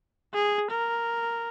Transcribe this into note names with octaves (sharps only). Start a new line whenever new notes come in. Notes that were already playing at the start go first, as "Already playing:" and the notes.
G#4
A#4